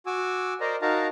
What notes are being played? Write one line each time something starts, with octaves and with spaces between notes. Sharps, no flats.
F#4 G#5 D6 E6
A#4 C5 D5 D#5 A#5
D#4 F#4 A#4 F5 A5 A#5